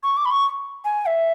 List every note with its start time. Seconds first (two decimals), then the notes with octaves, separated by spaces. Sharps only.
0.03 C#6
0.17 D6
0.25 B5
0.31 C#6
0.85 G#5
1.06 E5